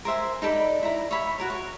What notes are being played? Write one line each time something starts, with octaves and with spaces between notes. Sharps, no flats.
A#4 C5 E5 G#5
D#4 A4 D5 B5
E4 A#5
C#5 E5 B5
F#4 A#4 C#5
C#5